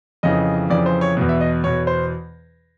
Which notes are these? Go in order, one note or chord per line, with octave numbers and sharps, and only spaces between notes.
F2 C#3 E3 D#5
F2 C#3 E3 D5
C5
C#5
E2 B2
E5
D#5
E2 B2 C#5
C5